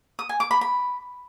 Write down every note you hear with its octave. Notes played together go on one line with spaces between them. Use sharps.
D#6
G#5
D6
B5
B5